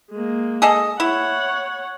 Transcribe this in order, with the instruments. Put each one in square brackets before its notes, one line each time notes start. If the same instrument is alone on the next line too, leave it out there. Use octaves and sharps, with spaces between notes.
[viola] G#3 A#3
[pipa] G#4 A4 D#5
[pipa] E4 [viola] C#5 F#5